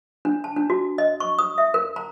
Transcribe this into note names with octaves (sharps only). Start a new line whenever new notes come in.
D4
A5
D4
F#4
D#5
C#6
D#6
E5
A#4
A#5